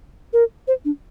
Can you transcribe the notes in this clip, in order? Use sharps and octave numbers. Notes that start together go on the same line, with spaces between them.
A#4
C5
D4